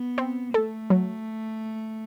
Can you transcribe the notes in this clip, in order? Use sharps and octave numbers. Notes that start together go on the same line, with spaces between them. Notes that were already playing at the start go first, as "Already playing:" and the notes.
Already playing: B3
C4
A3 A4
F#3